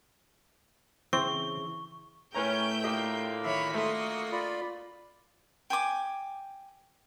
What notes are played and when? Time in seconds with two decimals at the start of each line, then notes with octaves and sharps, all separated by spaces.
1.13 C#3 E3 C4 C#6
2.35 A2 A3 C#4 A#4 B4 G5 A#5 G6
2.84 A#2 D3 A#3 G4 D#5
3.44 D#3 C#5 E5 B5
3.74 A3 F#4 D#5 C6
4.32 F4 D5 B5
5.70 G5 G#5 D6